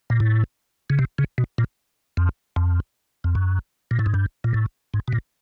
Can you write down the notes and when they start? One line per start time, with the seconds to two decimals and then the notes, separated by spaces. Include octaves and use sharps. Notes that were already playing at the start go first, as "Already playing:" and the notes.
0.10 A#2
0.20 A2
0.90 C#3
0.99 C3
1.18 C#3
1.38 B2
1.58 A#2
2.17 F2
2.56 F2
3.24 F2
3.35 F#2
3.91 A#2
3.99 A2
4.06 G#2
4.14 G2
4.44 A#2
4.54 A2
4.94 G#2
5.08 B2
5.13 A#2